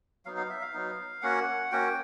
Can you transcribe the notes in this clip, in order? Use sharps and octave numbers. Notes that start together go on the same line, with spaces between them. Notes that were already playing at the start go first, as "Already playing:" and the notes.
F#3 B3 D#4 F5
F5
E5
F5
F#3 B3 D#4
A#3 C#4 F#4 F#5
A#3 C#4 F#4 G5